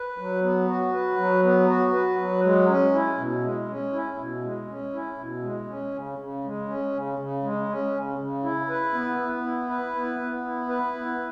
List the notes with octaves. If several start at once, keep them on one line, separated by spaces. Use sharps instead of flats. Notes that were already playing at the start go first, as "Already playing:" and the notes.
Already playing: B4
F#3
B3
F#4
B4
F#3
B3
F#4
B4
F#3
G#3
C#4
E4
B2
G#3
C#4
E4
B2
G#3
C#4
E4
B2
G#3
C#4
C#3
C#3
G#3
C#4
C#3
C#3
G#3
C#4
C#3
C#3
E4
B4
B3
B3
E4
B4
B3
B3
E4
B4
B3